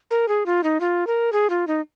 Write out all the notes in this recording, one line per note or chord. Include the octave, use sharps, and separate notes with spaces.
A#4
G#4
F4
D#4
F4
A#4
G#4
F4
D#4